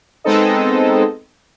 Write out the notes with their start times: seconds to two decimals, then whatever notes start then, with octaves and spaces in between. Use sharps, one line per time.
0.24 G#3 B3 C4 D#4 A4 D#5